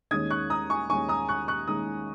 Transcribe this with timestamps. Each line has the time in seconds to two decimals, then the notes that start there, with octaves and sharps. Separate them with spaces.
0.11 D#2 D#3 G#3 C#4 D#6 G#6
0.30 C#6 F#6
0.50 A#5 D#6
0.70 G#5 C#6
0.90 D#2 D#3 G#3 C#4 G#5 C#6
1.09 A#5 D#6
1.29 C#6 F#6
1.48 C#6 F#6
1.68 D#2 D#3 G#3 C#4 A#5 D#6